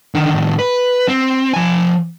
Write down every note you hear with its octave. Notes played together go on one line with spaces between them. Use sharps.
D3 D#3
A2 D#3
B4
C4
F3 G#5